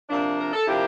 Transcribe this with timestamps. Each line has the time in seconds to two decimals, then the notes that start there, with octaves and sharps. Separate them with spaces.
0.09 C3 F3 A#3 D4
0.39 A#4
0.53 A4
0.67 C3 F3 A#3 D4 E4 G4